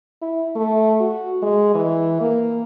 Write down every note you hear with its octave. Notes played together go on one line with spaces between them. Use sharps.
E4
A3
F#4
G#3
E3
A#3